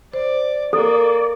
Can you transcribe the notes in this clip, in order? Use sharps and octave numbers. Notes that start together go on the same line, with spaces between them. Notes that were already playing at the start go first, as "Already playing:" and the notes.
C5 D5
A#3 A4 D5